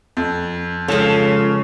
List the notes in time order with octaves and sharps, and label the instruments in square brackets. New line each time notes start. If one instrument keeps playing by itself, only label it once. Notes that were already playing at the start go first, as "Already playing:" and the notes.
[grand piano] F2
[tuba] C#2 [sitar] C#3 [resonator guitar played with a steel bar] F3 A4